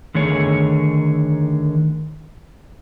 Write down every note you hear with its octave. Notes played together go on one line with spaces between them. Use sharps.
D3 D#3 A3 G#4 C#5